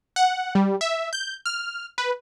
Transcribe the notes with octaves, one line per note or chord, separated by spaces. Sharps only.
F#5
G3
E5
G6
F6
B4